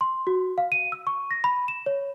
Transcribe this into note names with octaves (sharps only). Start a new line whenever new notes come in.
C6
F#4
F5
D#7
E6
C#6
A#6
B5
E7
C#5